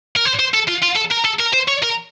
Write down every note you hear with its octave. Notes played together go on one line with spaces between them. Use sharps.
A#4
C5
C5
A4
F4
F4
A4
A#4
A4
A#4
C5
C#5
A#4